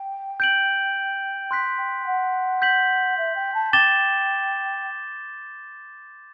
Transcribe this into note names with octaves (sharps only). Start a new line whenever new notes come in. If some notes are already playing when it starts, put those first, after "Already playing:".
Already playing: G5
G6 D7 F#7
C6 F#6 B6
G5
F#5
G6 B6 F#7
E5
G5
A5
G5 D6 A6 E7 G7